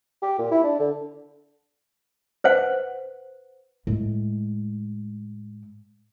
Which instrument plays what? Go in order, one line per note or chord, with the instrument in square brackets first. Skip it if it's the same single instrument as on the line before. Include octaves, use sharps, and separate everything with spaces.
[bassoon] G4
A#2
E4
D4
D3
[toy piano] B4 C5 F#5
[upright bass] A2 G#3